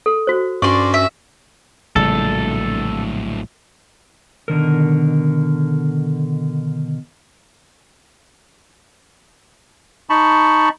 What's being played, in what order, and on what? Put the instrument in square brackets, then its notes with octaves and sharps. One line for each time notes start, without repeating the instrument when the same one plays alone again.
[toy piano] A4
F#4 C5
[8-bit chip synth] G2 C#4 F#4 [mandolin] D5 C6 [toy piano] C#6
[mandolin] E5
[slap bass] A#1 C#3 G3 [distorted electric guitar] A2 F#3 [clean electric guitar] A4
[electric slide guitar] B2 D3 D#3 A#4
[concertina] D#4 A5 B5 C#6